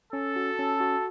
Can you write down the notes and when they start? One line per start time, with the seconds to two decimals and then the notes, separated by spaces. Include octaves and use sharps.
0.13 C#4 A4
0.36 F#4
0.59 C#4
0.80 F#4